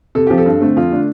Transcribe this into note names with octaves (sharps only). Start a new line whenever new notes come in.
C3 A4
F3 C4 G4
A4
G2
D3 A3 C4
F2 F4
D3 A3 D4